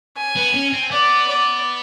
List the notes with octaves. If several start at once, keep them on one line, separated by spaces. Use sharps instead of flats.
G#5
B3
C#4
C4
B3 D5
D5